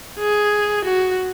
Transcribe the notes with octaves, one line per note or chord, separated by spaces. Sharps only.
G#4
F#4